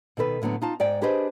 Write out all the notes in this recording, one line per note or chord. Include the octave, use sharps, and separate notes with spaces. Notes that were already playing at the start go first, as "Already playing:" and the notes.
B2 D#3 A4 B4
A2 D3 F#3 B3
D#4 F4 A5
G#2 D5 G5
D4 G4 G#4 B4 C5 D#5